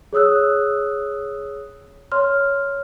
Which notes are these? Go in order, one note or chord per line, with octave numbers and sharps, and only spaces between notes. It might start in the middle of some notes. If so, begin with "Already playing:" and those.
G#4 C#5 D#6 E6 F#6
C#5 C6 F6